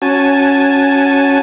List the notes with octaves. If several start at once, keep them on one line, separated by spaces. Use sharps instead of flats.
C#4 F#4 G#5 A5